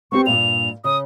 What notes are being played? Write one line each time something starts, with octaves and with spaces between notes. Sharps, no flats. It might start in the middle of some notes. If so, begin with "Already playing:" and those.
B3 C4 G4 C#6
G2 A#2 D5 F7
C#3 D#6